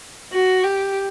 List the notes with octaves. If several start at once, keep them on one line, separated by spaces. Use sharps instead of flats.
F#4
G4